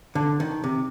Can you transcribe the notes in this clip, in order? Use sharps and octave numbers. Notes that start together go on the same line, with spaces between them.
D3
D#3
C3